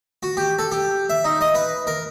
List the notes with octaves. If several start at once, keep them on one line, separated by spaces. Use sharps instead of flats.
F#4
G4
A4
G4
E5
D#4
D#5
B4
A#4